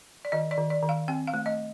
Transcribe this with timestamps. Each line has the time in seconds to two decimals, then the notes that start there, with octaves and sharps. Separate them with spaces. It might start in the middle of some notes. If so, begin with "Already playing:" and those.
0.25 D5
0.32 D#3 D#5
0.51 D5
0.58 D#3
0.70 D5
0.82 D#3
0.89 F5
1.08 C4 G5
1.27 F5
1.34 A3
1.46 D#5